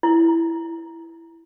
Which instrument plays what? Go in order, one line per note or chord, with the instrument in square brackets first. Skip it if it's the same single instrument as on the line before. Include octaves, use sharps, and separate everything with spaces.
[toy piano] E4